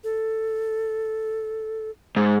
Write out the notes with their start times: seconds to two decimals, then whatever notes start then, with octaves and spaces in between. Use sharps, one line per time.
0.04 A4
2.17 G#2